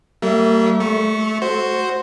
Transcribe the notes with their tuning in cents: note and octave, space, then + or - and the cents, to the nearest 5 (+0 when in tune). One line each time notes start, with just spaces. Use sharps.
G3 -35 A#3 -40 E5 +0
A3 -25 C#6 +0
F#4 +0 C5 +0